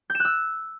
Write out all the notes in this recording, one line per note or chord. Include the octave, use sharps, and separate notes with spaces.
G6
E7
F#6
E6